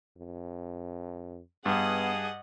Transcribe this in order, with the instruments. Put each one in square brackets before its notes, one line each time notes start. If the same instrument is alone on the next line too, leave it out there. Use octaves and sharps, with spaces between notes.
[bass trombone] F2
[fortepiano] G2 [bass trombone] B3 [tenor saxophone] G#4 [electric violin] D#5 F#5